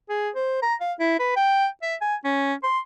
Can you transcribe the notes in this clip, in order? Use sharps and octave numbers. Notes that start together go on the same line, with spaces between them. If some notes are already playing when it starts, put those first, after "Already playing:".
G#4
C5
A#5
F5
E4
B4
G5
E5
G#5
C#4
C6